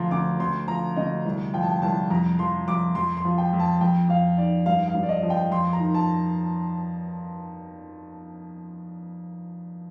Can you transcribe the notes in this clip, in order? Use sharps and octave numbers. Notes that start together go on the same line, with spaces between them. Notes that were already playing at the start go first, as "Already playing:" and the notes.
Already playing: D2 F3 A#5 C6
D2 D6
D2 C6
F3 A#5
D2 D#5
C2
F3 G5
A5
G5
C2 A5
F2 A#5
F3 C6
F2 D6
F2 C6
C6
F3
G5
F2
A5
F2 G5
F2 F5
D#3 D5
G2 F5
F5
G2
D5
D#5
F3
G5
F2 C6
A#5
D#3
A5